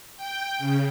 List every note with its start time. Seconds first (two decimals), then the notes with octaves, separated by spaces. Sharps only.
0.17 G5
0.59 C#3